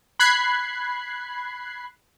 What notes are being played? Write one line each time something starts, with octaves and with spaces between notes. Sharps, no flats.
B5 F#6 G#6 C7